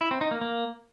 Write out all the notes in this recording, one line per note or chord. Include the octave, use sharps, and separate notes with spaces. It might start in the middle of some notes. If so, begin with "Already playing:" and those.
E4
C4
D#4
A#3
A#3